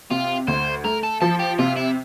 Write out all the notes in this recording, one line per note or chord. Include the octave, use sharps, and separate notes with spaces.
C3 F4
D2 C5
A3 A#4
A4
F3 A4
G4
C3 F4
E4